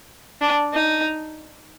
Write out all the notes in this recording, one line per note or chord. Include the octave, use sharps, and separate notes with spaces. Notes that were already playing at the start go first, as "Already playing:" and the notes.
D4
D#4